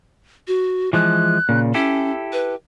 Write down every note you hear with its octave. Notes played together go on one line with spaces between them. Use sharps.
F#4
E3 F3 G#3 F#6
A#2 C#3
C#4 E4 G4 A4
B4